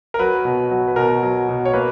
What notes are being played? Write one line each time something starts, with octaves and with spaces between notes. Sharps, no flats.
A#4
F#3 B4
B2
F#3
B4
B2 A#4
F#3
B2
C#5
A#3 B4